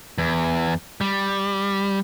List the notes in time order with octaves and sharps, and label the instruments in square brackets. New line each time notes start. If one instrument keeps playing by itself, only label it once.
[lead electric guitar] E2
G3